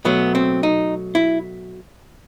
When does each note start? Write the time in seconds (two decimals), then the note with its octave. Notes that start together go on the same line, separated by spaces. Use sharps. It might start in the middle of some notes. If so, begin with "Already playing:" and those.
0.05 B2 F#3 A3 B3
0.35 C4
0.63 D#4
1.15 E4